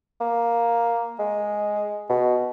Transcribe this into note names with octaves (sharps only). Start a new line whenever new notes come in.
A#3
G#3
B2